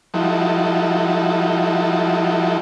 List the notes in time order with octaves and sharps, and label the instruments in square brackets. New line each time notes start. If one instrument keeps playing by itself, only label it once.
[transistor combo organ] F3 G3 D#4 E4 F#4 A4